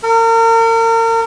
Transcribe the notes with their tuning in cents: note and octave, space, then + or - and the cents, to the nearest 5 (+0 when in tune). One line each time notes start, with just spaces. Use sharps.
A#4 -35